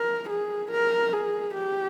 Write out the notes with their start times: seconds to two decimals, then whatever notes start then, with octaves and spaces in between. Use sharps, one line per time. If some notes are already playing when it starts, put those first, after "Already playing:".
Already playing: A#4
0.30 G#4
0.72 A#4
1.13 G#4
1.55 G4